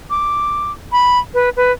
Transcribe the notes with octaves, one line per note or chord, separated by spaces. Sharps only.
D6
B5
B4
B4